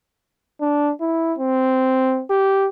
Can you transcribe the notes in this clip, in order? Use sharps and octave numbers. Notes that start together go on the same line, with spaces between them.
D4
E4
C4
G4